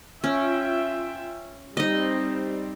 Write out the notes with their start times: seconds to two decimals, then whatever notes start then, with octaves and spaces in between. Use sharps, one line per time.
0.24 C#4 F4 E5 G5
1.77 G3 C4 D#4 D#5